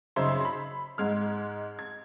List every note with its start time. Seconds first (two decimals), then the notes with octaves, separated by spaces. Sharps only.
0.16 F#2 C#3 D#4 C5 E5 C6
0.45 B5
0.98 G#2 G#3 F6
1.79 G#6